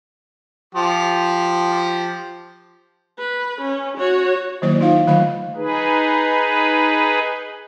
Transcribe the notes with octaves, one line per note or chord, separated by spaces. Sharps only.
F3 G4
B4
C#4
F#4 C#5
D#3 F#3 A#3 E4 C5 D5
D#4 F4 C5 F5
D3 D#3 F#3 A3 F5 B5
D#4 G#4 B4